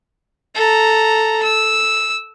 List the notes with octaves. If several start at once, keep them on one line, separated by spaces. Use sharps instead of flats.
A4 A#5
E6